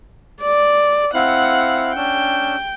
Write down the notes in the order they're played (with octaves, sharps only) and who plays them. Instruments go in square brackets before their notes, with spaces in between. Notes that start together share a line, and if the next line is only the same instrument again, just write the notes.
[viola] D5
[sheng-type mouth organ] C4 E4 F5 [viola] F#5
[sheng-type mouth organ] C#4 D4 E6 [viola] G5